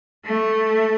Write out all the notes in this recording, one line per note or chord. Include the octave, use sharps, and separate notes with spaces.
A3